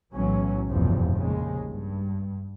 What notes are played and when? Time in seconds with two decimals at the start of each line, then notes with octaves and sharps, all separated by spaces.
0.13 B1 A2 E3 F#3 C#4
0.69 F1 B1 E2 G2 F3
1.16 A#1 D#2 C#3 G#3
1.67 G2